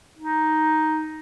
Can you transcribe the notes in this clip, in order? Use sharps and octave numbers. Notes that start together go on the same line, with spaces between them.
D#4